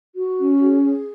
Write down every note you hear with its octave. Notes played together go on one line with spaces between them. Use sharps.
F#4
C#4
G#4
G#4